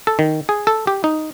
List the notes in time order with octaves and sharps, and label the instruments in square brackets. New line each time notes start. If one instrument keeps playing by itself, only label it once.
[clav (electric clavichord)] A4
D#3
G#4
A4
G4
D#4